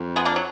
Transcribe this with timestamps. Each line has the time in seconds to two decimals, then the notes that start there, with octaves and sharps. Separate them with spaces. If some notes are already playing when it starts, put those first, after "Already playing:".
Already playing: F2
0.16 G#3 B3
0.25 A#3 D4
0.36 F#3